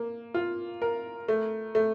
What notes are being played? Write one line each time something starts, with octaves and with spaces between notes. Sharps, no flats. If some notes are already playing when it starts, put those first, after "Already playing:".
Already playing: A#3
F4
A#4
A3
A3